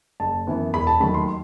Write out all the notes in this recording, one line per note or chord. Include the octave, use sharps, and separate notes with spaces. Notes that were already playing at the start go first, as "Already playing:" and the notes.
F#1 A5
F#2 E3 B3
E1 B5
A5
D#2 D#3 F#3 A3 B5
C6
C6